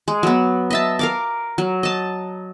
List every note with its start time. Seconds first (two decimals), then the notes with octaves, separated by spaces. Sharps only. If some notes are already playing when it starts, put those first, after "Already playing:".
0.08 G#3
0.23 F#3 B3
0.70 D#5 E5 A5
0.99 A#4 F5 D6
1.58 F#3
1.83 D#5 A5